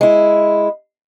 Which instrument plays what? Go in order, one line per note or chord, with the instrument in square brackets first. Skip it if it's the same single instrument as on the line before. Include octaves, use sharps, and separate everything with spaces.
[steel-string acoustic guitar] G#3 E4